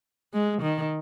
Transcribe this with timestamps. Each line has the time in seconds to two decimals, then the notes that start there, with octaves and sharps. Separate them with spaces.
0.34 G#3
0.63 D#3